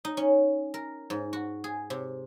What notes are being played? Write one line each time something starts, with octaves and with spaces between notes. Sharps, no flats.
D#4
C#4
A#4
G#2
F#4
G#4
C3